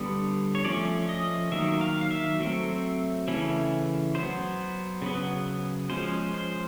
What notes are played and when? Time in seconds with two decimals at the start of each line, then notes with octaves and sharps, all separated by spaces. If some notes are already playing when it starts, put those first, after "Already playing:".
Already playing: D3 G3 B3
0.55 C#5
0.65 F3 A3 C#4 D5
1.09 D#5
1.52 D#3 F#3 A#3 E5
1.81 F5
2.01 F5
2.11 E5
2.40 F#3 A3 C4
3.28 C#3 E3 A3 C#4
4.15 F#3 B3 C5
5.02 C#3 F#3 B3
5.90 F3 G#3 C#4 C5
6.34 C5